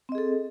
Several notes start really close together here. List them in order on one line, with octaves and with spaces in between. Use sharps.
C4 D#5 G#4 A4